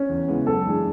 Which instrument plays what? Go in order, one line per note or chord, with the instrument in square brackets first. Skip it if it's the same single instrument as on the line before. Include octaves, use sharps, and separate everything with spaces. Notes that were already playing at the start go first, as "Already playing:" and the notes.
Already playing: [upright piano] C#4
[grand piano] E2
C#3 E3 G#3 B3
[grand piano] F#2 [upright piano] A4
[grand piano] E3 G#3 D4 G#4